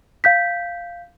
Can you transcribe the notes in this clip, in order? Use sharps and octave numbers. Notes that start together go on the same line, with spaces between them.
F5 G6 B6